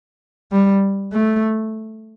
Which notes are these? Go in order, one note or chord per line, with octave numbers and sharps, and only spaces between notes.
G3
A3